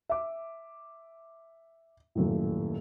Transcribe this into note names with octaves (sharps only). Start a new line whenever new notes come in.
E5 D6
D#1 F#2 A2